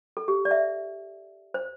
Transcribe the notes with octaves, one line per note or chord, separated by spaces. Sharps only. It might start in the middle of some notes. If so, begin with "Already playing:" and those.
A4
G4
D5
E5
C5